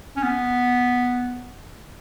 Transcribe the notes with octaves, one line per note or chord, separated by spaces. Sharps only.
C#4
B3